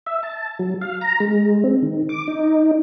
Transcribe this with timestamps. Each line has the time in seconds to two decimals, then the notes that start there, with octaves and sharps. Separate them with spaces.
0.07 E5
0.23 A5
0.59 F#3
0.82 F5
1.01 A#5
1.20 G#3
1.64 C4
1.82 D#3
2.09 D6
2.28 D#4